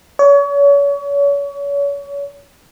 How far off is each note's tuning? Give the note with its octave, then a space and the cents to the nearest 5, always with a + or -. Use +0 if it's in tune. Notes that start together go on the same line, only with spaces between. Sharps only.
C#5 +35